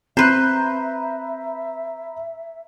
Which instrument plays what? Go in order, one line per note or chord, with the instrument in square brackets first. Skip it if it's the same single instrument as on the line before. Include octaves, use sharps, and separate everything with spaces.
[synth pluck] C4 [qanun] B4 C5 [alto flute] E5 [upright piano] A#5 B5 G6